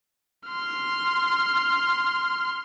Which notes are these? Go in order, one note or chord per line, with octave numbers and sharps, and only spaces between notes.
C6 F6